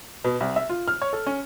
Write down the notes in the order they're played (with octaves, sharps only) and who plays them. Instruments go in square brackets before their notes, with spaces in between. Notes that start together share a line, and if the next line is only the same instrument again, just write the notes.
[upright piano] B2
C2
E5
F4
F6
C#5
A4
C#4